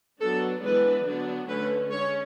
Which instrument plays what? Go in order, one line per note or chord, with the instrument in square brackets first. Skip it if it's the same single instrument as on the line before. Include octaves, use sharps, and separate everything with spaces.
[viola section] F#3 B3 D4 A4
E3 G#3 B3 D4 B4
D3 F#3 B3 D4
D3 A3 C#4 B4
G#3 C#4 C#5